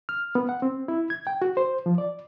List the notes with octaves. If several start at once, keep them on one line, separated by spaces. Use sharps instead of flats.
F6
B3
F#5
C4
E4
G#6
G5
F#4
C5
F3
D5